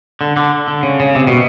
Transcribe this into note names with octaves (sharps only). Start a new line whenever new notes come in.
D3
D3
D3
C#3
C#3
C3
B2